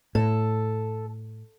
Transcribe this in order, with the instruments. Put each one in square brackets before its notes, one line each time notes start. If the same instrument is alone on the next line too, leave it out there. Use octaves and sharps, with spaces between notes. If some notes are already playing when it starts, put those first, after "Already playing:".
[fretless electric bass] A2 [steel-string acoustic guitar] A4